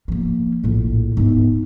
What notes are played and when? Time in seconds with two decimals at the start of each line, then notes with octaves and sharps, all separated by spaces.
0.08 F3 A#3
0.64 A#1 A2
1.17 G#2 B3